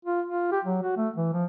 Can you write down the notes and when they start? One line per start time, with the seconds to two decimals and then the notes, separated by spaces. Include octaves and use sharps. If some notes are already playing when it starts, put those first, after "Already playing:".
0.05 F4
0.27 F4
0.52 G4
0.64 F#3
0.83 F#4
0.97 A3
1.16 E3
1.33 F3